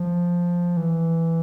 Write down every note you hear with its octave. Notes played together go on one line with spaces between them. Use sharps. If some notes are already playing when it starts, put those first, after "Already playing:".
Already playing: F3
E3